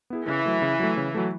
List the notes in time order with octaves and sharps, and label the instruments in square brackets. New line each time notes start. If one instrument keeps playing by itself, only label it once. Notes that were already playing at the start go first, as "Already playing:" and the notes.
[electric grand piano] B3 E4 G#4
[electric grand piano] C#3 [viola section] E3
[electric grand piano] F#3 A3
C#3
F#3 A3
C#3
F#3 A3